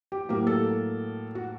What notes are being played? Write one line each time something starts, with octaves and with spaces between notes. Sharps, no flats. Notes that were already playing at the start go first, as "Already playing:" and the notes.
G4
A2 F#3 A#3 G4
A4
F#4